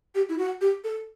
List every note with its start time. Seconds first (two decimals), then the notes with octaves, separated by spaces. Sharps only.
0.15 G4
0.29 E4
0.38 F#4
0.61 G4
0.84 A4